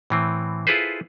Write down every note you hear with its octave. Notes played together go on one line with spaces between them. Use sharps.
A2 E3 C4
E4 F4 G#4 A4 B4 C5